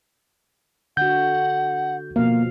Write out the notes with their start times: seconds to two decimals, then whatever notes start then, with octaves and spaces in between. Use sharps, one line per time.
0.97 D3 F#4 F#5 G6
2.16 B2 F3 A#3 F5